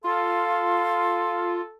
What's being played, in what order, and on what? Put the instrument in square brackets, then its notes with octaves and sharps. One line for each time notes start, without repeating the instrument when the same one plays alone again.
[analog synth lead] F4 [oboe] A4 [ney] F5 [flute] C6